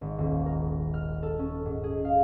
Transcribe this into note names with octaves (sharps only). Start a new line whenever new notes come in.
G#1
D#1
A#4
F6
A4
C#4
G#2
G#4
F5